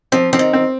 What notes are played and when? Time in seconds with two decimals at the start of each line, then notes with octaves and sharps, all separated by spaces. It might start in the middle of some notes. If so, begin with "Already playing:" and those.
0.12 F3 C4
0.33 F3 C4
0.39 D#3
0.53 C4